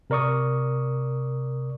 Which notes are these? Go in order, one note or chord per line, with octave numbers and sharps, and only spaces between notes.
C3 A#4 D5 C#6 D#6